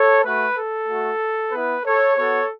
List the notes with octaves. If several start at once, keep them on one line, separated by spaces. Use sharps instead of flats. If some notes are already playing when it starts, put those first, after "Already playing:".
Already playing: A4 C#5
A3 F#4 B4
A4
A3 F#4
B3 E4 B4
A4 C#5
B3 F#4 A4 C#5